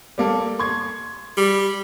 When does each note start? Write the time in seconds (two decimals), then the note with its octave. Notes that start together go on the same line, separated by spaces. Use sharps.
0.18 G3 A#3 A4
0.59 C6 C#6 G#6
1.37 G3